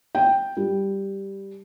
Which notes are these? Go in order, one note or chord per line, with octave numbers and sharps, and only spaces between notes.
G5
G3